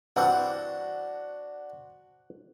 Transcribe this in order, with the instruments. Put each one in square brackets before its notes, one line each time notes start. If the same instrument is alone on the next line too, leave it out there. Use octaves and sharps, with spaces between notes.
[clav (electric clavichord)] G2 E3 C4 [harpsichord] D4 F#4 C5 [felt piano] F#5